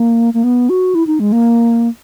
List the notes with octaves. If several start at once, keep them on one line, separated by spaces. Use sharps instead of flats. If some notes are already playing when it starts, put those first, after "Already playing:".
Already playing: A#3
A#3
B3
F#4
E4
D#4
G#3
A#3